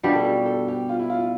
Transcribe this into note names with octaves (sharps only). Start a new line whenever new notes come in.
B2 G3 D4 F4
A4
G4
A4
G4
F4
E4
F4
F4